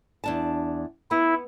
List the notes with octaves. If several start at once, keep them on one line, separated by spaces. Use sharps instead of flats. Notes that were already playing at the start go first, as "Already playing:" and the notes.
E2 D4 A5
B3 E4